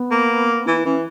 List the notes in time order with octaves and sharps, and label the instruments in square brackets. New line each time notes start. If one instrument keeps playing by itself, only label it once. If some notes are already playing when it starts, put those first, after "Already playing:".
Already playing: [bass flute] B3
[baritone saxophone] A#3
[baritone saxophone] E3 [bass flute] E4
[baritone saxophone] E3 [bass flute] C#4